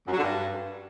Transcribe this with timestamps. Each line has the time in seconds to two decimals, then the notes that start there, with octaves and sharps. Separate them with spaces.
0.07 F#2
0.13 F#3
0.18 D3
0.23 G2